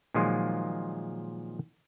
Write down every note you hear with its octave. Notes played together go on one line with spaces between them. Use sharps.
A#2 D#3 F3 F#3 G#3 F4